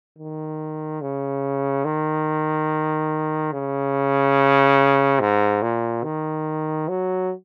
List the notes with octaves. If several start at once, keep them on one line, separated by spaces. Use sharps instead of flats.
D#3
C#3
D#3
C#3
G#2
A#2
D#3
F#3